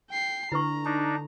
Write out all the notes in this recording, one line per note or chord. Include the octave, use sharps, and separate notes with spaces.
G5 C7
D3 E4 B4 A#5 C#6
D4 D#4